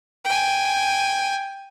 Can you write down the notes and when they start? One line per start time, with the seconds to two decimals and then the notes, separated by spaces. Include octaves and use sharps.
0.25 G5 G#5